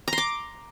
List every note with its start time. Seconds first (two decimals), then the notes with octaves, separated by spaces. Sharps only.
0.08 A#5
0.13 C6
0.18 D6